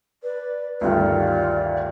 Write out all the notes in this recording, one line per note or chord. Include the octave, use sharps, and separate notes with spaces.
B4 D5
D2 G2 D#3 F4 D5